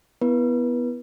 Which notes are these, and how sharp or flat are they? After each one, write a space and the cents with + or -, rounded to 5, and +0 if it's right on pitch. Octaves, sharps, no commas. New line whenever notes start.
B3 +0 E4 +0 B4 -30